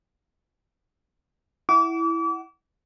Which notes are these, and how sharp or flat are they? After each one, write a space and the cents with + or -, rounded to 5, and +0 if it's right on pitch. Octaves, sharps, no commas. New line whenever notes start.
E4 +0 F#5 +20 D6 -35